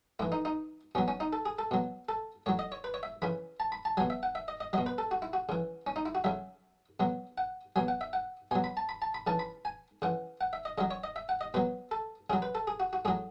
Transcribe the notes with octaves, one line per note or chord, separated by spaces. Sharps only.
A2 E3 E4
D#4
D#4
B2 F#3 C#4
C#4
D#4
A4
G#4
A4
B2 F#3
A4
A2 F#3 C#5
D#5
C#5
B4
C#5
E5
C#3 E3 B5
A5
B5
A5
B2 F#3 G#5
E5
F#5
E5
D#5
D#5
B2 F#3 D#5
B4
A4
F#4
E4
F#4
C#3 E3
C#4
D#4
E4
F#4
C#3 F#3 E5
B2 F#3
F#5
B2 F#3 G#5
F#5
E5
F#5
B2 F#3 G#5
B5
A5
B5
A5
B5
C#3 E3 A5
B5
G#5
C#3 E3 F#5
F#5
E5
D#5
C#3 F#3 D#5
C#5
D#5
E5
F#5
D#5
B2 F#3 B4
A4
C#3 F#3 G#4
B4
A4
G#4
F#4
F#4
A2 F#3 G#4